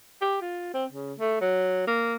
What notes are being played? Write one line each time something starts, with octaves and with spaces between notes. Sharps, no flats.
G4
F4
C4
C#3
A3
F#3
A#3